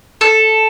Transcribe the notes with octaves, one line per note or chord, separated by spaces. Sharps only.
A4